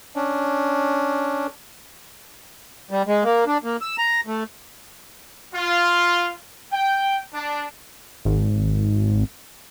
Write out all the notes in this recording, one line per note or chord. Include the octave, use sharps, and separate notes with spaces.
C#4 D4
G3
G#3
A#3
D4
A#3
E6
A#5
A3
F4
G5
D4
G#1